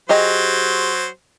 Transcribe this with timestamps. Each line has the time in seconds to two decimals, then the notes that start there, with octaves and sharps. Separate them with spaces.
0.09 F#3 G4 G#4 C5 D#5